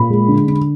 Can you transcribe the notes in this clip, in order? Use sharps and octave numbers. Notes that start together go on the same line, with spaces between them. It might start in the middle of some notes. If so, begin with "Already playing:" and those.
Already playing: A#2 B5
G#3
D3
D3